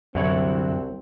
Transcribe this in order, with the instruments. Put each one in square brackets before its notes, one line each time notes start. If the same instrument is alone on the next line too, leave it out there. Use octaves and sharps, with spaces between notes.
[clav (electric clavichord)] C2 C#5 [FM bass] F#2 [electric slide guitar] D3 F#3 E4 [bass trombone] C4